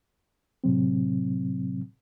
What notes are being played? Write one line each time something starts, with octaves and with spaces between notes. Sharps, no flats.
A2 C3 F#3 C4